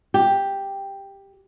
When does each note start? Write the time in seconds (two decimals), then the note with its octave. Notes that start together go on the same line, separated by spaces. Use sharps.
0.14 G4